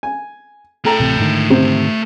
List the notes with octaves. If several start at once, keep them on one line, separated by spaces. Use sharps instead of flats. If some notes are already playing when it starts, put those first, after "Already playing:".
G#5
A3 A4 G5 A#5
D1 A1 C3
G#2 D3 D#3
C3 C5